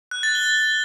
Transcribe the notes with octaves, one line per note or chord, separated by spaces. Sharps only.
F#6
A6
G7